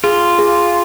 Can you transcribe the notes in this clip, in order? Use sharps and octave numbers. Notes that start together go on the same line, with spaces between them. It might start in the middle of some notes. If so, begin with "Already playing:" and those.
F4 G#4
G#4